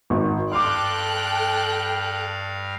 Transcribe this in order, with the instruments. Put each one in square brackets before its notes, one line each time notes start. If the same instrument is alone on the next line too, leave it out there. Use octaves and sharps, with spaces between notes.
[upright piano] G#1
[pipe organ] G2 F5 [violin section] A4 G5 F#6 [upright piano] C6 D6